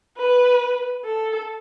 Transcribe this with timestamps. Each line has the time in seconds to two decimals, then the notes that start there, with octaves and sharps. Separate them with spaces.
0.17 B4
1.06 A4